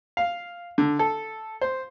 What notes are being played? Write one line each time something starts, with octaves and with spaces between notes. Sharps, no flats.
F5
D3
A4
C5